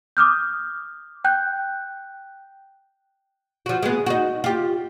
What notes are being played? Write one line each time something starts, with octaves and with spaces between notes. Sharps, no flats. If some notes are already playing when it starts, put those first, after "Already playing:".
D6 D#6 F6 G6
G5 F#6 G6
F3 F#4
G#3 B3
D#4 F#4
F4 G4